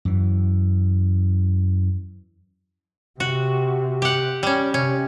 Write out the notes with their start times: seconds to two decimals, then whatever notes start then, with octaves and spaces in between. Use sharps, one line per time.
0.05 F#2 E3
3.20 C3 F#4
4.02 G4 F#5
4.43 G3 C#4
4.74 C3 C#4